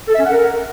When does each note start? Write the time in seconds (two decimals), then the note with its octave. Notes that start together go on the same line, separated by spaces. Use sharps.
0.08 A4
0.14 E5
0.20 C#4
0.26 F#5
0.32 A#4